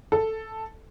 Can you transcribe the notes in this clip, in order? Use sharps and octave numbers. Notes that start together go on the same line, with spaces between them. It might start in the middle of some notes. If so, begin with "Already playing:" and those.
A4